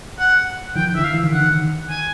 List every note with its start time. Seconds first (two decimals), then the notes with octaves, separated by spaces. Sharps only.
0.19 F#5
0.76 D#3 F3 G5
0.95 D3 E3 E5
1.04 F5
1.14 E3
1.24 D#3
1.33 D3 F#5
1.43 D#3
1.90 G#5